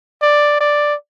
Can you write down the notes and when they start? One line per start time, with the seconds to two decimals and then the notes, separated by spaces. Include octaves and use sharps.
0.22 D5
0.60 D5